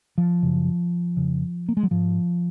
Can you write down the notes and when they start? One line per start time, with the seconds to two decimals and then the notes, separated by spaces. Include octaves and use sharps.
0.18 F3
0.43 F#2 C#3
1.17 F2 C#3
1.69 A#3
1.77 G#3
1.83 F#3
1.91 G#2 F3